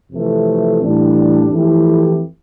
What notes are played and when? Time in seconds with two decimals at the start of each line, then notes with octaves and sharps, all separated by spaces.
0.12 F2 C3 E3 A3
0.80 A2 E3 G3 D4
1.48 F2 E3 A3 E4 G4